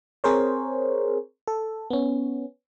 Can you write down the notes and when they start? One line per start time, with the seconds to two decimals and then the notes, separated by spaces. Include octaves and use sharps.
0.24 C4 G#4 A#4 C5 C#5
1.48 A4
1.90 B3 C#4